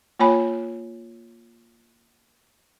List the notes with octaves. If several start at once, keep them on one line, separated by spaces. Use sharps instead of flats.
A#3 F4 C#5 G#5 B5